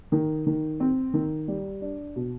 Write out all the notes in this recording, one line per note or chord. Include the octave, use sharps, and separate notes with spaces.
D#3
D#3
C4
D#3
G3
D4
B2